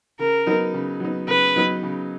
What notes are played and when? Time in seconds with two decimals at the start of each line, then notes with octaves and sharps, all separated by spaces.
0.19 C#3 A#4
0.47 F#3 B3 D#4
0.74 C#3
1.00 F#3 B3 D#4
1.28 C#3 B4
1.56 F#3 B3 D#4
1.83 C#3